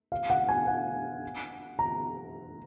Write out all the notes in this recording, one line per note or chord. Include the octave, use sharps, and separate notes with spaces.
F5
F#5
G#5
F#5
A#5